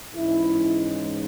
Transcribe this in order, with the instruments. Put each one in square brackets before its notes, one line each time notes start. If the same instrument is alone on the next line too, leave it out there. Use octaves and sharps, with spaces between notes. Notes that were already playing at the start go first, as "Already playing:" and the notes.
[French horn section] G#2 E3 G#3 C#4 E4